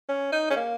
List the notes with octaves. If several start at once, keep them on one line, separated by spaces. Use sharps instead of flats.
C#4
D#4
C#4
A#3